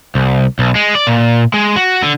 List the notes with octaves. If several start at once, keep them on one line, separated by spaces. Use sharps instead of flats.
C2
B1
G#3
D5
A#2
G#3
F#4
D3